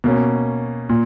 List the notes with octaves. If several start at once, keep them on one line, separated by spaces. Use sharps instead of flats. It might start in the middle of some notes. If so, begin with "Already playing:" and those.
B2 A#3 C#4
A#2